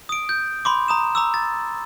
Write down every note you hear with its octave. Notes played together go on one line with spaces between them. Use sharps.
D#6 D7
G6
B5 C6 D6
A#5 D#6 E7
A#5 D6 E6
A6